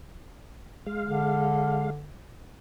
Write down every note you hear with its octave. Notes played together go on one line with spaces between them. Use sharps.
G#3 F5
D3